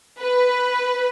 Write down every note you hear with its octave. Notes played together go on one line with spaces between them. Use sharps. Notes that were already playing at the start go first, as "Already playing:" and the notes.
B4